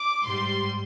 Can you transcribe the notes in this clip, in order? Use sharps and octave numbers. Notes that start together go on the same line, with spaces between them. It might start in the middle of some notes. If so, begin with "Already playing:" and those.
Already playing: D6
G#2 G3 C6